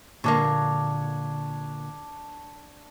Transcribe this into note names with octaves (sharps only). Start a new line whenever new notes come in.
A#2 D3 A#3 D4 C#5